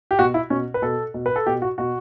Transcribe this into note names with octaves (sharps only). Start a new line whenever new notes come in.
G4
B2 F#4
E4
B2 C#4
B4
B2 A4
B2
B4
A4
B2 G4
F#4
B2 F#4